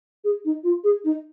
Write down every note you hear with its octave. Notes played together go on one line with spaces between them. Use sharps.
G#4
D#4
F4
G#4
D#4